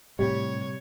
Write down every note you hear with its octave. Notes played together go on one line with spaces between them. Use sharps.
A2 C3 G3 C#5